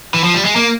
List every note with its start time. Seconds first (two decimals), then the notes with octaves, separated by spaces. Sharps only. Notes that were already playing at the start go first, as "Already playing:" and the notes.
0.14 E3
0.24 F3
0.34 G3
0.45 G#3
0.56 A#3